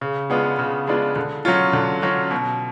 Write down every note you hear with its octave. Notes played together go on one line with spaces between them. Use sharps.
C#3
G#3 B3 D4 F4
C#3
G#3 B3 D4 F4
D3
F#3 C#4 F4
D3
F#3 C#4 F4
B2